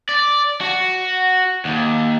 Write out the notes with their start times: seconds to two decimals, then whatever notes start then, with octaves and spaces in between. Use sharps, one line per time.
0.09 D5
0.61 F#4
1.65 D#2